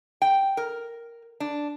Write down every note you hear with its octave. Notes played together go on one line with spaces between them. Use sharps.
G5
A#4
D4